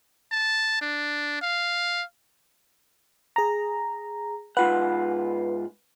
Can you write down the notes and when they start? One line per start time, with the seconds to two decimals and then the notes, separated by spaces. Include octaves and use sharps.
0.32 A5
0.82 D4
1.42 F5
3.36 G#4 A#5
4.57 G#2 F4 B4 F#5